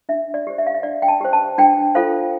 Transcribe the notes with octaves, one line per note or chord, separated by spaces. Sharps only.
D4 E5
D5
G4 C5
E5
F5
E5
D4 D5
G5
A5
G4 C5
A5
D4 G5
F4 A4 C5 F5